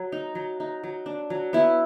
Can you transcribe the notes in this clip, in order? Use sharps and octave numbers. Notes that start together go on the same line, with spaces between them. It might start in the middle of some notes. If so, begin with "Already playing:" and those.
Already playing: F#3
D#4
F#3
D#4
F#3
D4
F#3
B3 E4